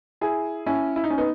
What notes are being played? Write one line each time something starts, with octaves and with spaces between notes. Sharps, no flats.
E4 G#4
C#4 E4
E4
D#4
C#4
B3 D#4